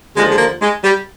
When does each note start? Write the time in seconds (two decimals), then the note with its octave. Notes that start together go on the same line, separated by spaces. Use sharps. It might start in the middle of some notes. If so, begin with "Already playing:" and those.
0.16 D#2 D3 F3 G#3
0.30 G#3
0.38 A#3
0.62 G#3
0.84 G3